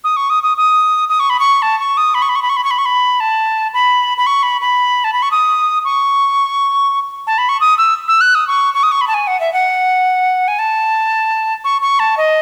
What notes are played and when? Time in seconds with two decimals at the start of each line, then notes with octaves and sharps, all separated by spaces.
0.04 D#6
0.16 C#6
0.30 D#6
0.43 D#6
0.57 D#6
1.09 D#6
1.20 C#6
1.30 B5
1.39 C#6
1.62 A5
1.80 C#6
1.97 D#6
2.14 B5
2.22 C#6
2.29 B5
2.35 C#6
2.42 B5
2.49 C#6
2.57 B5
2.64 C#6
2.71 B5
2.78 C#6
2.85 B5
3.20 A5
3.74 B5
4.17 B5
4.26 C#6
4.43 B5
4.61 B5
5.04 A5
5.13 B5
5.22 C#6
5.31 D#6
5.84 C#6
7.27 A5
7.38 B5
7.49 C#6
7.60 D#6
7.78 E6
8.08 E6
8.21 F#6
8.35 D#6
8.47 C#6
8.74 C#6
8.83 D#6
8.91 C#6
9.01 B5
9.08 A5
9.14 G#5
9.27 F#5
9.40 E5
9.53 F#5
10.48 G#5
10.59 A5
11.64 C#6
11.82 C#6
11.99 A5
12.17 D#5